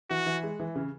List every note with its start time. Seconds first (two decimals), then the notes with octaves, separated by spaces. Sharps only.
0.10 E3 F#4
0.26 E3
0.43 G#3
0.59 E3
0.75 C#3